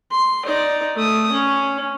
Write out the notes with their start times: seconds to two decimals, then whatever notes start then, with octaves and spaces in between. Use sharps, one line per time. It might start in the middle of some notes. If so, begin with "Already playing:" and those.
0.11 C6
0.45 D#4 D5
0.96 A3 D#6
1.31 C#4